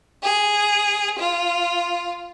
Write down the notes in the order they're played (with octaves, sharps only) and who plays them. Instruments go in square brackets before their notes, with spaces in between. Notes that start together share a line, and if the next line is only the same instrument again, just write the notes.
[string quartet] G#4
F4